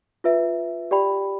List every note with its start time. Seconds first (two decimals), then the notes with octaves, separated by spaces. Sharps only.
0.24 F4 B4 E5
0.91 G4 D5 G5 B5